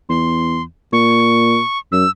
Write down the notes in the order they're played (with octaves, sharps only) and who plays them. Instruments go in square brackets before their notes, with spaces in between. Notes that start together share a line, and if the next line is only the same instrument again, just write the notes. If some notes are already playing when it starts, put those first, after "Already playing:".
[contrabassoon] E2 [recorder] C6
[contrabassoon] A#2 [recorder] C#6
[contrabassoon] F#2 [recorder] E6